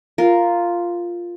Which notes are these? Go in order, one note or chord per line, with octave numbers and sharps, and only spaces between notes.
F4 A#4